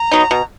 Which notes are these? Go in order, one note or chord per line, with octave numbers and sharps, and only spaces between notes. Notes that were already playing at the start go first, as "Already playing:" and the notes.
Already playing: A#5
F#3 B3 D#4
B2